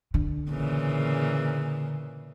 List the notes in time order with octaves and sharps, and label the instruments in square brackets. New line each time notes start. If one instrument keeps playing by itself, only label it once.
[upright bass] D3
[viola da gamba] A#2 C#3 E3